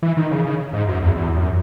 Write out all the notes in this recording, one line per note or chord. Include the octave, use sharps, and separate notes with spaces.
E3
D#3
C#3
C#3
G#2
F#2
E2
E2
F#2